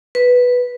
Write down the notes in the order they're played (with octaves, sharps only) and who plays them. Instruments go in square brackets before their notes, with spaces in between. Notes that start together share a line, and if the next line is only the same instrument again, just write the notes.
[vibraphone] B4